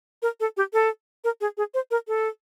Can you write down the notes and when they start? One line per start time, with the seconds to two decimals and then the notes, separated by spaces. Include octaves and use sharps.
0.22 A#4
0.40 A4
0.57 G4
0.73 A4
1.24 A#4
1.41 G#4
1.57 G#4
1.74 C5
1.91 A#4
2.08 A4